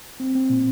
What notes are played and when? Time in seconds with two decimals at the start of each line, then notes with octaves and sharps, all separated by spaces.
0.20 C4
0.35 C4
0.50 A#2